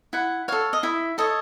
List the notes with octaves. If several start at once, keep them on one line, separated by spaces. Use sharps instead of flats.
E4 F#5
A4 C#5 F5
D#5
E4 E5
A4 C#5 D#5